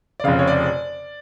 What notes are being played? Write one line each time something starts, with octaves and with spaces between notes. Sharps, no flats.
D5
F1 F2 C#3 F5
C#5
D5